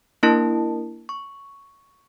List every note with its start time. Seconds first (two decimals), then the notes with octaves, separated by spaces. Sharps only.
0.23 A#3 D4 E4 A#4 A5
1.09 C#6